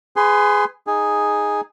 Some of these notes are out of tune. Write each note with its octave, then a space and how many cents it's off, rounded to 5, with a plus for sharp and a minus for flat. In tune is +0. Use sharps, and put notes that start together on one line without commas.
G#4 +0 B4 +30 C6 +0
D#4 +0 G#4 +0